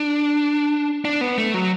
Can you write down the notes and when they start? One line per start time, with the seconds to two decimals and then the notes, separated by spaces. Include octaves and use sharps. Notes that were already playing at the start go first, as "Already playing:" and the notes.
Already playing: D4
1.05 D4
1.21 B3
1.38 A3
1.54 F#3